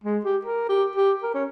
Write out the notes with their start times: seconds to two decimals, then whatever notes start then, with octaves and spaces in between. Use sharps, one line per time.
0.04 G#3
0.25 G4
0.45 A#4
0.69 G4
0.96 G4
1.23 A#4
1.35 C#4